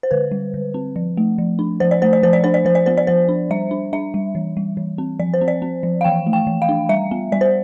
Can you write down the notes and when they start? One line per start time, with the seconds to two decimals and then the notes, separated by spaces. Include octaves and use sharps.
0.03 C5
0.11 D3 B4
0.31 G3
0.54 D3
0.74 C4
0.96 F3
1.17 A3
1.38 F3
1.59 D4
1.80 F3 C5
1.91 D5
2.02 A3 C5
2.13 D5
2.23 F3 C5
2.33 D5
2.44 D4 C5
2.54 D5
2.65 F3 C5
2.75 D5
2.86 B3 C5
2.97 D5
3.07 F3 C5
3.29 D4
3.50 G3 E5
3.71 D4
3.93 D4 E5
4.14 G3
4.35 E3
4.57 G3
4.77 E3
4.98 C4
5.20 F3 D5
5.34 C5
5.41 C4
5.48 D5
5.62 C4
5.83 F3
6.01 F5
6.04 E3 G5
6.27 A3
6.33 G5
6.47 E3
6.62 F5
6.69 D4
6.89 G3 E5
7.11 B3
7.32 G3 D5
7.41 C5